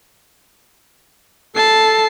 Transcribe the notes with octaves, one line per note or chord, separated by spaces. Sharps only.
A4 A5 C7